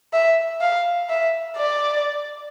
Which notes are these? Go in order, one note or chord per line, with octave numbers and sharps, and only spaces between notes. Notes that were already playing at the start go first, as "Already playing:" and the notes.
E5
F5
E5
D5